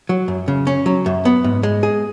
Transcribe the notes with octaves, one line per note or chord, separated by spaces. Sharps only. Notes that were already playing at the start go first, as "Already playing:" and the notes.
F#3
F#2
C#3
C#4
F#3
F#2
B3
G#2
G#3
G#4